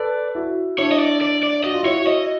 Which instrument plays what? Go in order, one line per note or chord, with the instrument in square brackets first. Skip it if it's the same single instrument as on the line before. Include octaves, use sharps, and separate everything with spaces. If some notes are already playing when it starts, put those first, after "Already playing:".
Already playing: [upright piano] A4 B4 [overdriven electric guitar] D5
[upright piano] E4 F#4
[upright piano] D4 E4 [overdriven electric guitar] C#5
[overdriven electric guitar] D#5
D5
D5
D5
[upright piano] F#4 [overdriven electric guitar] D#5
[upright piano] F4
[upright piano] E4 F#4 [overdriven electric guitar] C#5
[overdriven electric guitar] D#5